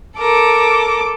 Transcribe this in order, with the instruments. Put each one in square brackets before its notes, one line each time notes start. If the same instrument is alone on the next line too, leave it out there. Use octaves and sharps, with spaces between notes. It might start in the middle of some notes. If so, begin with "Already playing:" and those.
[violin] A4 D6 [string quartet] A#4